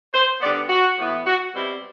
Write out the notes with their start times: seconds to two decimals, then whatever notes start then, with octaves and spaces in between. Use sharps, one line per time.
0.13 C5
0.41 D3 G3 B3 D5
0.69 F#4
0.97 A2 E3 B3
1.26 F#4
1.54 B2 G3 C4 E4